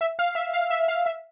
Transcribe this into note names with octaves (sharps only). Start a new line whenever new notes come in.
E5
F5
E5
F5
E5
F5
E5